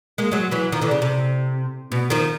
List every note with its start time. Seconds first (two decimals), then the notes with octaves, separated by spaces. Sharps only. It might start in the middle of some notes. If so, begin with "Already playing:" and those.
0.18 G#3 A#3
0.32 F#3 G#3
0.51 E3 F#3
0.72 D#3 F3
0.81 D3 E3
0.91 C#3
1.02 C3
1.92 B2
2.10 D#3 F3